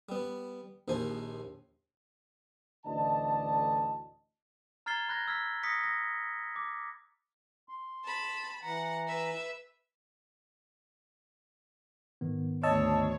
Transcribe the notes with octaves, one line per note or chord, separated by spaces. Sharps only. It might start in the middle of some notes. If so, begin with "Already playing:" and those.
G3 B3
A#1 D#2 F3 C5 G#5
A1 D2 D3 D5 D#5 A5
A#5 F6 G#6 A6 C7 G7
B5 F#6 G#6 A#6
E6 F6 G#6 B6
D#6 A#6 B6 C#7
A#6
D6
C6
A5 B5
E3 F#5 A#5
B4 E5
G#2 D#3 B3
D2 C#5 D#5 A5 E6